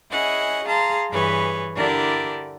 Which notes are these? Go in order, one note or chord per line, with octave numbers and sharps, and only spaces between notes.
C#4 E4 G#4 D#5 F#5
G#4 F5 A5 A#5 C6
G2 E3 G#4 B4 C#5
D3 D4 E4 G4 A#4 D5